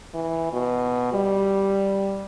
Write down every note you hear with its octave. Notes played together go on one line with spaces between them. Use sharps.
E3
B2
G3